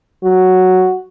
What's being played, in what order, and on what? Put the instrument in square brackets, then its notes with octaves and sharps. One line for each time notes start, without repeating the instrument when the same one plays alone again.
[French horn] F#3 [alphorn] F#4